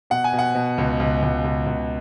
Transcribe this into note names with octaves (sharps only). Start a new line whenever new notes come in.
B2 F#5
G#5
B2
F#5
B2
C#2
C#2
C#2
C#2
C#2